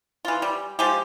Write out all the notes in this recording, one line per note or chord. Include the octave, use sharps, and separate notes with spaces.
E3 F4
G3
F3 G#3 G4